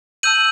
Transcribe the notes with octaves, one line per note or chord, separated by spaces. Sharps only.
A5 E6 G6 D#7 F#7